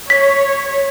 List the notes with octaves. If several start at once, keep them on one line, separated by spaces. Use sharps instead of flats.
C#5 B6